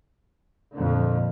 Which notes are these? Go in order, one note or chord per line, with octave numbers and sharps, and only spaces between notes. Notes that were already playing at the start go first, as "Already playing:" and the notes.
F2 A#2 D3